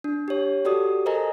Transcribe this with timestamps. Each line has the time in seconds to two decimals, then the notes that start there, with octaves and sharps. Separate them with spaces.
0.04 D4
0.28 G4 C#5
0.65 F#4 G4 A4 D5 D#6
1.06 A4 A#4 C5 D#5 G#5 A#5